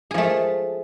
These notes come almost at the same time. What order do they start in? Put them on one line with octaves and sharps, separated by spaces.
G#4 F3 A3